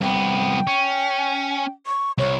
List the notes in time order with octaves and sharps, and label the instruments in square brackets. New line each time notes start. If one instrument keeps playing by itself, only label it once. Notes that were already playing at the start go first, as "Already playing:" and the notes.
[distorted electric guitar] C2 B3 [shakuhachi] G5
[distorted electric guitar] C#4
[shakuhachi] C#6
[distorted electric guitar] C2 [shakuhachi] C#5